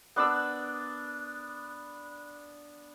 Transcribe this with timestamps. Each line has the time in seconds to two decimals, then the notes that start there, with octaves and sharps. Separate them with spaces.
0.16 B3 D4 D5 E6